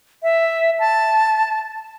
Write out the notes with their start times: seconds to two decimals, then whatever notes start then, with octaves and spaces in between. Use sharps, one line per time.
0.23 E5
0.79 A5